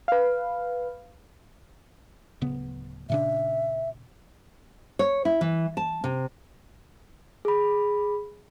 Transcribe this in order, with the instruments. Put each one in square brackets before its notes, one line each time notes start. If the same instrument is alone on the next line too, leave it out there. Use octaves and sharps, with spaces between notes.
[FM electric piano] B4 F5
[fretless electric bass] D1 C#3 B3
[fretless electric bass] A#2 C#3 D4 [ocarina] E5
[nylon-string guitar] C#5
E4
E3
A5
C3
[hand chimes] G#4 B5